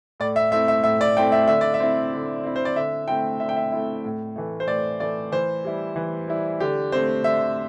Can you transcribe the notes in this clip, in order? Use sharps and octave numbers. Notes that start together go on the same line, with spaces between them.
A2 D5
E5
A3 C4 E4 E5
E5
A2 E5
D5
A3 C4 E4 G5
E5
D3 E5
D5
E5
C4 E4
D3
C4 E4
C5
D5
D3 E5
A3 C4 E4 G5
D3 E5
G5
E5
A3 C4 E4
A2
E3 A3
C5
A2 D5
E3 A3 D5
E3 C5
G3 E4
E3
G3 E4
D3 G4
A3 C4 C5
D3 E5